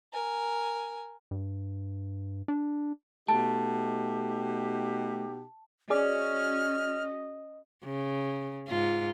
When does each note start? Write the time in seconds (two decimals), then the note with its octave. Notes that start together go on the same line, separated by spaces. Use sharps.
0.12 A#4 G#5
1.31 G2
2.48 D4
3.28 B2 A3 D#4 G4 A5
5.90 C#4 F#4 G#4 D5 D#5 F6
7.84 C#3
8.68 G#2 F4